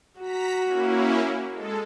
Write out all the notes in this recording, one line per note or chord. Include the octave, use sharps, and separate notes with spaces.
F#4 A#5 B6
A#3 C#4 E4
G#3 A4